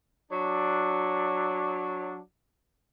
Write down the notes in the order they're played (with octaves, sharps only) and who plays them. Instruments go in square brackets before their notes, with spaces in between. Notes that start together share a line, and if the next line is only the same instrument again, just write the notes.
[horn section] F#3 D4